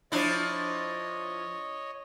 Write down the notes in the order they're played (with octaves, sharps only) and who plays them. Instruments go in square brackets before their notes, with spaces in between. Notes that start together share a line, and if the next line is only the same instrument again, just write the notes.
[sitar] F3 D4 E4 [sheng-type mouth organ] C#5 D#5